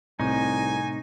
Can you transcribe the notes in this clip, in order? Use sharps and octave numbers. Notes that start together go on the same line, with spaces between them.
C2 A2 C3 D#4 G#5